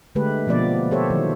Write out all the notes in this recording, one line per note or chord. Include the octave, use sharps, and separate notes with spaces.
D3 G#3 A3 G4 B4
B2 F3 A#3 B3 D5
G4 A4 C5 C#5 E5
D#3 F#3